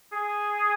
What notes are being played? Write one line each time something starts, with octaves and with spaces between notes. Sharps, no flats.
G#4